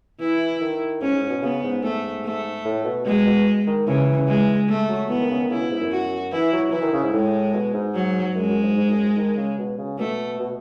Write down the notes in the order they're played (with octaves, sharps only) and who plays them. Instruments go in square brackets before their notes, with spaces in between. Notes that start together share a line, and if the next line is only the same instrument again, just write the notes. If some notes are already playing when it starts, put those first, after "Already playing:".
[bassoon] E3 [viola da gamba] E4
[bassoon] D#3
[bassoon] G#2 [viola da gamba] C#4
[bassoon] G#2
B2
[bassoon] C#3 [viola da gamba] B3
[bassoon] G#2
[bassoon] G#2 [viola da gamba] A3
[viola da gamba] A3
[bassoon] A2
B2
[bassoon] B2 [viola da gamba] G#3
[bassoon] B2
D#3
[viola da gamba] C#3 [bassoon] E3
[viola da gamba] G#3
A3
[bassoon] F#3
[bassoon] E3 [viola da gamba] B3
[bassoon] D#3
C#3
D#3
[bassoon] C#3 [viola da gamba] E4
[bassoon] B2
G#2
F#2
[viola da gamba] F#4
[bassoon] E3 [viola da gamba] E4
[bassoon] F#3
[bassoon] E3 [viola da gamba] E4
[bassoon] D#3
C#3
G#2
[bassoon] A2 [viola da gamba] G#3
[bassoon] B2
G#2
[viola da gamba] F#3
[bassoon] F#2 [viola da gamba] G#3
[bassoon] F#2
G#2
G#2
F#2
G#2
D#3
C#3
B2
C#3
[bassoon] B2 [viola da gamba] A3
[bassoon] B2